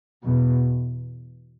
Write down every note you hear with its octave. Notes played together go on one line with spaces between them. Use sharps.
E2 B2